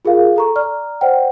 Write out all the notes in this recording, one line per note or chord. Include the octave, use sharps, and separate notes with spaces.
F4 G#4 A#4 F5
A4 A#5 C#6
D5 A#5 F6
C5 D5 F#5 G5